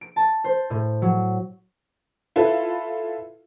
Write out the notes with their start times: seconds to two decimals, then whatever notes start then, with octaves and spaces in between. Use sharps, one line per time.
0.01 D7
0.16 A5
0.44 C5
0.70 A2
1.02 F#3
2.36 E4 F4 A4 B4